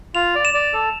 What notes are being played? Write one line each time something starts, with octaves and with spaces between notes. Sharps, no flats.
F4 F7
D5
E7
D5
A4